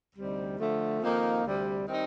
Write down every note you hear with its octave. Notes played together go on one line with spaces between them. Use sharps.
D2 C3 G3 C4 D#4
D3 F3 A3
F2 D#3 A#3 D#4
D2 C3 G3
D#3 G3 C4 D#4